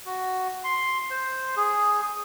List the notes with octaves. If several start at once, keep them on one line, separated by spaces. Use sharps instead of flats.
F#4
C6
C5
G#4